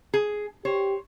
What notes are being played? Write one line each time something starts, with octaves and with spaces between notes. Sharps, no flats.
G#4
G4 C5 C#5